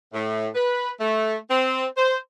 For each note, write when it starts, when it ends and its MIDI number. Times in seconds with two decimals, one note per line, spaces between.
0.13 0.48 45
0.55 0.90 71
1.00 1.36 57
1.50 1.86 60
1.97 2.17 72